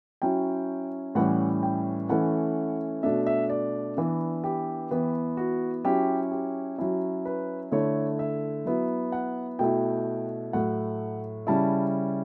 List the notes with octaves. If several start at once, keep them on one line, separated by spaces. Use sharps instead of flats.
F#3 C#4 E4 G5
A2 E3 G3 C#4 F#5
G5
E3 A3 C#4 E4 F#5
B2 A3 D4 E5
E5
D5
E3 B3 D4
G4
E3 B3 E4
F#4
F#3 C#4 E4 G4
G4
F#3 C#4 E4
B4
D3 A3 E4 C#5
E5
F#3 B3 E4
F#5
B2 A3 E4 G5
A2 F#3 A3 F#5
C#3 G3 C#4 E4 A5